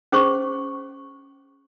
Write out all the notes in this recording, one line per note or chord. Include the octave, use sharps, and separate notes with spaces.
C#4 G#4 C5 C#6